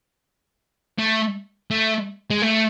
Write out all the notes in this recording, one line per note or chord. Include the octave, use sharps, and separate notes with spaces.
A3
A3
G#3
A3